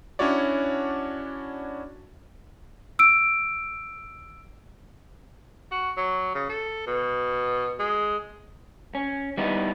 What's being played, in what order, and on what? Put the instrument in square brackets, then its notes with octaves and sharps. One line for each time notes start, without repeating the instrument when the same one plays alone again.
[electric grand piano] C#4 D4 E4 F#4 C#5 D5
[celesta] E6 D7
[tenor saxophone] F#4
F#3
C#3
A4
B2
G#3
[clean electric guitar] C#4
G3 B3 D#4 E4